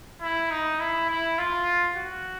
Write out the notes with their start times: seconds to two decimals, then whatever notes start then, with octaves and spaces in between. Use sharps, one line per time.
0.22 E4
0.51 D#4
0.80 E4
1.09 E4
1.39 F4
1.96 F#4